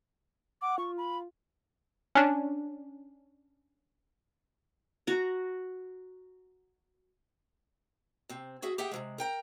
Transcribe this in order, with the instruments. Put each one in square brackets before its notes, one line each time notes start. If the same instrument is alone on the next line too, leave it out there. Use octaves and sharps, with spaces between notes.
[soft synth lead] F#5 [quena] D6
[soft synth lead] F4 [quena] C#6
[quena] B5
[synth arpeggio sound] C#4 D4
[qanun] F#4 A#5
[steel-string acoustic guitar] C3 C4
F#4 G#4 E5
G4 G#4 E5 F#5 G5
C3 E3 G#3
A#4 G5 A#5